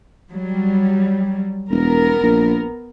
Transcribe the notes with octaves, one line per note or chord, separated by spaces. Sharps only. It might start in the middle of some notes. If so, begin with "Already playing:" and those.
F#3 G3
E1 B3 A#4
A#1